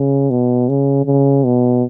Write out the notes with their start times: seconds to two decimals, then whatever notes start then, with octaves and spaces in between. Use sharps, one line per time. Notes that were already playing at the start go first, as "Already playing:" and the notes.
Already playing: C#3
0.31 B2
0.69 C#3
1.06 C#3
1.44 B2